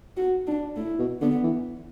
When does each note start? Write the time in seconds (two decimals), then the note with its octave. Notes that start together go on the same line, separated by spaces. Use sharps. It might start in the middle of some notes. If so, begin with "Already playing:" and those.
0.17 F#4
0.47 D4
0.76 A2 E4
0.99 B2
1.21 D3 B3
1.43 E3